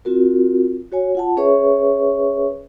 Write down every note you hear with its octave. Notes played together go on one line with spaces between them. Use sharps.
C4 F4 F#4 A#4
F#4 C#5 G#5
F4 F#5 A5
C#4 G#4 B4 C#5 E5 C#6